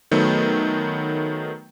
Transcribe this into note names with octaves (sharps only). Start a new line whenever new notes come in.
D#3 F#3 A3 B3